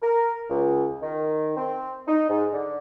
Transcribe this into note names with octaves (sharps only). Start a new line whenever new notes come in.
A#4
C#2
D#3
C4
D#4
G#2
D3